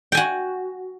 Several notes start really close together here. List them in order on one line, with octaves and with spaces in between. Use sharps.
G5 G#5 F#4